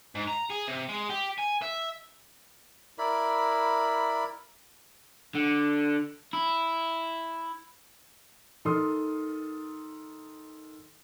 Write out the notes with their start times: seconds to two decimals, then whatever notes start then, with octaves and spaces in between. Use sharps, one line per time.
0.15 G#2
0.28 A#5
0.50 G#4
0.67 C3
0.89 G#3
1.09 G4
1.38 G#5
1.62 E5
2.98 E4 A#4 D5 B5
5.35 D3
6.33 E4
8.65 D#3 A4 C6 D#6 F6